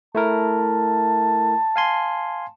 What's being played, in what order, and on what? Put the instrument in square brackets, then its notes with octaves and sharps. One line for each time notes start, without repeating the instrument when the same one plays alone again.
[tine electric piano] A3 E4 A#4 [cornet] A5
[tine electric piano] F5 G#5 C6